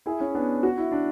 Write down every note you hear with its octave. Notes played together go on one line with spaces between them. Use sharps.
E4 G#4
C#4 E4
B3 D4
F#4
E4
D4